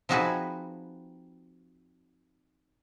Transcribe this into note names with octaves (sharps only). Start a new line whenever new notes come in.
F3 C4 D#4 F#4 G#4 B4